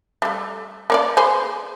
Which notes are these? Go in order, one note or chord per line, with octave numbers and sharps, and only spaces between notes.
G3 A3
A#3 C#5 D5
G#4 B4 C5